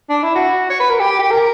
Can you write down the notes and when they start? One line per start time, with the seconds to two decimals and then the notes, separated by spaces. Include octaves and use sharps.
0.09 D4
0.23 E4
0.35 F#4
0.70 C#5
0.80 B4
0.90 A#4
1.00 G4
1.19 G4
1.30 A#4